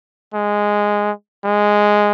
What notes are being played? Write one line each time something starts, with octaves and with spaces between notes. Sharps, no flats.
G#3
G#3